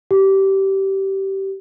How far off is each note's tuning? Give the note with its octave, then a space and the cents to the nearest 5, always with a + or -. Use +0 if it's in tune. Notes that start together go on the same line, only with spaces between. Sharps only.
G4 -20